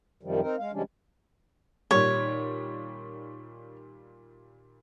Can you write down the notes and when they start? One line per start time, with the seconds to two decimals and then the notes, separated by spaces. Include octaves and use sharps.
0.23 F#2 C3 D#3 F3 G3
0.42 C4 D#4 A#4
0.58 G#3 F5
0.73 C3 E3 G3 G#3 C#4 D4
1.91 A#2 D#3 G3 C#5